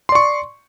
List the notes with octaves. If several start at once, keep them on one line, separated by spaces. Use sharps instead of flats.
D5 C6 C#6